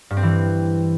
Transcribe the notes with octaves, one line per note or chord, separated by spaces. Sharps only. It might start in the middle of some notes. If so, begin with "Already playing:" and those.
G2
C4
E3